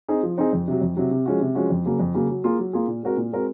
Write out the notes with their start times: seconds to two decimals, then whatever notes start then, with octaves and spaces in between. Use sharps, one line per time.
0.08 C4 D#4 G#4
0.23 F3
0.38 C4 D#4 G#4
0.53 F2
0.68 C3 F#3
0.81 F2
0.97 C3 F#3
1.11 C3
1.26 F3 G#3 C#4 F#4
1.41 C3
1.55 F3 G#3 C#4 F#4
1.70 F2
1.86 C#3 F#3 A#3
2.00 F2
2.14 C#3 F#3 A#3
2.29 F#3
2.44 A#3 F4 G#4
2.59 F#3
2.73 A#3 F4 G#4
2.88 A#2
3.03 G#3 C4 F#4 A#4
3.17 A#2
3.32 G#3 C4 F#4 A#4